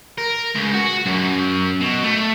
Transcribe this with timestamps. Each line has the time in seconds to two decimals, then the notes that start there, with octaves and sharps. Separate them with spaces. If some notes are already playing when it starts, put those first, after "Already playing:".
0.18 A#4
0.55 C#2
0.74 F#4
1.06 F#2
1.80 B2
2.03 A3